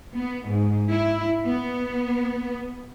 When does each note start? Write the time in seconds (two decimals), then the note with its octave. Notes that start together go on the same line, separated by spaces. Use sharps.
0.16 B3
0.48 G#2
0.91 E4
1.45 B3